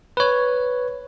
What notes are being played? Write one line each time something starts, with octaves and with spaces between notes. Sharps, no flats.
B4 C#5